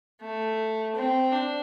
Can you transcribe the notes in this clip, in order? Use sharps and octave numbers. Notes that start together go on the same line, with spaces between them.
A3
C4
D4